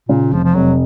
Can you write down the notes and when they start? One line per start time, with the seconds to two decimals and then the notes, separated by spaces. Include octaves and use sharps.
0.09 A#2 C#3
0.32 F1 F3
0.44 F3
0.55 F1 F#3